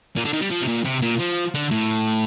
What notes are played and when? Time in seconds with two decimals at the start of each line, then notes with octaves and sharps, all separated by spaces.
0.16 A#2
0.24 D3
0.33 D#3
0.41 G3
0.50 F3
0.62 C3
0.67 A#2
0.85 C3
1.01 A#2
1.19 F3
1.54 D3
1.71 A2